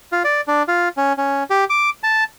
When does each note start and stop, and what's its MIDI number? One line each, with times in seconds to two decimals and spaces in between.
0.12 0.23 65
0.24 0.41 74
0.48 0.63 62
0.68 0.89 65
0.97 1.13 61
1.17 1.43 61
1.50 1.64 67
1.70 1.90 86
2.03 2.24 81